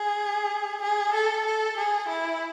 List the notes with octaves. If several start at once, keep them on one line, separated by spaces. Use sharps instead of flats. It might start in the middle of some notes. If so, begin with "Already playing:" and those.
Already playing: G#4
G#4
A4
A4
G#4
E4